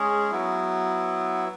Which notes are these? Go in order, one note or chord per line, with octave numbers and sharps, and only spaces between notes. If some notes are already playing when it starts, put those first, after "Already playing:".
Already playing: G#3 C#4 G#4
F#3 B3 E4